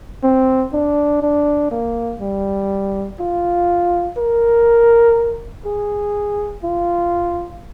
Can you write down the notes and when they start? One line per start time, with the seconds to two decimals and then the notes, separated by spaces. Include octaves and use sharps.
0.23 C4
0.73 D4
1.22 D4
1.71 A#3
2.21 G3
3.20 F4
4.17 A#4
5.65 G#4
6.64 F4